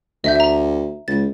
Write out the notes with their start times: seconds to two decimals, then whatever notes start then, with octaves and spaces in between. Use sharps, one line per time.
0.24 D2 D#5 E5 G6
0.35 E5 A#5
1.08 C#2 A6